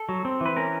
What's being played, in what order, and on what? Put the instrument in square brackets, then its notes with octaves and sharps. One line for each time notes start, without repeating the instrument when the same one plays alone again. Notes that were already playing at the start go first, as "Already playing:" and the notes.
Already playing: [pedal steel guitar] A4
F#3
C4
E3 B4
C#4 A#4